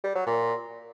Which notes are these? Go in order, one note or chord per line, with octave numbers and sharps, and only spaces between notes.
G3
F#3
A#2